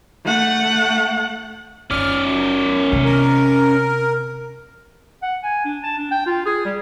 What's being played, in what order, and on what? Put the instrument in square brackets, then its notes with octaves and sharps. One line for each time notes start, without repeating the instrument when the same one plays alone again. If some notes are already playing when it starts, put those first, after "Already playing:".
[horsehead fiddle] A3 F#5
[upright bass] F#1 [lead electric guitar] C#4 D5 [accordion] F6
[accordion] F#2
[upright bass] C3
[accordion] A#4
[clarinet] F#5
G#5
D4
A5
D4
G5
F4
G#4
G3